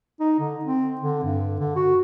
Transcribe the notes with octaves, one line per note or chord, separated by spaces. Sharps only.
D#4
D3
C4
D3
G2
D3
F#4